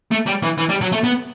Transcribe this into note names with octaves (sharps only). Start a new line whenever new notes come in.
A3
G3
E3
E3
G3
F#3
A3
B3